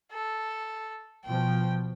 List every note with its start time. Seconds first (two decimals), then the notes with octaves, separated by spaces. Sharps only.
0.12 A4
1.25 B2 F3 G5